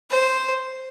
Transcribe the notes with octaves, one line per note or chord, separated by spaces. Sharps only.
C5